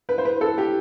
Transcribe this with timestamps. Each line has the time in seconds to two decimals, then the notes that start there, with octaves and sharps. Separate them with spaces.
0.09 B4
0.18 C5
0.25 B4
0.41 A4
0.58 G4